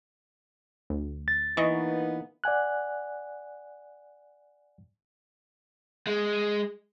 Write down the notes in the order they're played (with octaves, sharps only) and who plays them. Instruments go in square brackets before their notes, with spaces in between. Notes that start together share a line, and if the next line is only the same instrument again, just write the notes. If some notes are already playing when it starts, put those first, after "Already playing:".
[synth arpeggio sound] D2
[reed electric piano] A6
[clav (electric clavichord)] E3 [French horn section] A#3 B3 D#4 [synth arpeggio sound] D#5 C#6
[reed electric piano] D5 F#5 G#5 F#6
[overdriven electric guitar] G#3